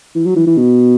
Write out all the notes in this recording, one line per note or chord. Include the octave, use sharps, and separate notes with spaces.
E3
F#3
E3
E3
B2